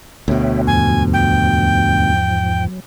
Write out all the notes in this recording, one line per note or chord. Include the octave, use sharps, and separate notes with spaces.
D2 B2 C#5 E5 G5
E2 G#2 F3 G#5
G5
F#3